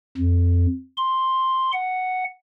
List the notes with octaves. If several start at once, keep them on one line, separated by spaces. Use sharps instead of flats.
F2
C6
F#5